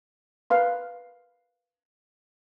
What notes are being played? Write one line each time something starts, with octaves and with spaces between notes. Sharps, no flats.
A#4 B4 F5 C6